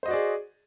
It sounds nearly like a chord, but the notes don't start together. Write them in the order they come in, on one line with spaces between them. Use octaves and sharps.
C5 D#5 F#4 D5 G#4